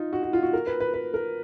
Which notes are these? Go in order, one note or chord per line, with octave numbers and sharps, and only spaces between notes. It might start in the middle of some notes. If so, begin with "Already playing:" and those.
Already playing: D#4 F4
F#4
F#4
F4
F#4
A#4
B4
B4
B4
A#4